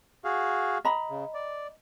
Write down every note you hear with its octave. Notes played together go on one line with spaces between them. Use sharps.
F#4 G#4 F5
D#5 A#5 B5
C#3
D5